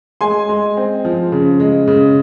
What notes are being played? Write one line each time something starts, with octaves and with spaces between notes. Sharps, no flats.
G#3 G#5 C6
G#3
C4
F3
C#3
G#3
C#3